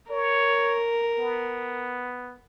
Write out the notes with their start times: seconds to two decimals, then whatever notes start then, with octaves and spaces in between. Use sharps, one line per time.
0.11 A#4 C#5
1.18 B3